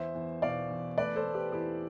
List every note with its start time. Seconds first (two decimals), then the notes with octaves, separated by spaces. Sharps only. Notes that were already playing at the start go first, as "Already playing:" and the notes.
Already playing: E2 B3 C5 E5
0.15 E2
0.42 B2 D5 F5
0.70 E2
0.98 A3 B4 D5
1.16 A4 C5
1.25 A3
1.34 G4 B4
1.52 E2 E4 G4